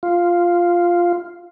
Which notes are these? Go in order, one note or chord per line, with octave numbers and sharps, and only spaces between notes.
F4